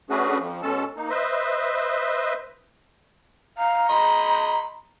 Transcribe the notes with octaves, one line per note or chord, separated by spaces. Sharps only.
A3 C#4 D4 F#4 G#4 B4
F2 F3
B2 G#3 C#4 A4 A5
A#3 D#4
B4 C5 D#5 E5
F5 A#5
D#5 B5 C6